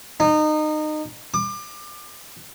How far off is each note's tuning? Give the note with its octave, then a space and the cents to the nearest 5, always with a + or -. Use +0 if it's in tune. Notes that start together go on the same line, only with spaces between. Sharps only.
D#4 -25
D6 +30